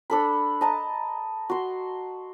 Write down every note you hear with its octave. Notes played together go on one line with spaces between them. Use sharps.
D4 A4 B5
D#5 A5 A#5
F#4 C6